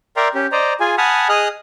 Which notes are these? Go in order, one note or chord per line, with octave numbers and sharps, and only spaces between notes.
A#4 D5 E5 G5 A#5 C6
C#4 G4
C5 D5 D#5 A#5
F4 G#4 G#5
F#5 G#5 A5 B5 D#6 F6
G#4 D#5 D#6 F6 F#6